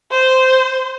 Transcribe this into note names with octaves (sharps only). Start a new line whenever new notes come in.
C5